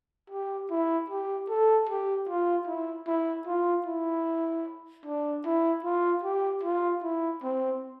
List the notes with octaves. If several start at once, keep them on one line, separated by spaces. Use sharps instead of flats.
G4
E4
G4
A4
G4
F4
E4
E4
F4
E4
D4
E4
F4
G4
F4
E4
C4